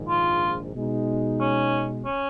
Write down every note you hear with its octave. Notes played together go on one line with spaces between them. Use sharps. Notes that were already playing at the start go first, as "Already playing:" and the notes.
Already playing: A#1 G#2 D#3
F4
B2 G#3 D#4
C#4
C#4